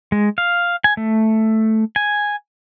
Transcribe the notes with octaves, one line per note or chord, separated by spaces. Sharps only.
G#3
F5
G#5
A3
G#5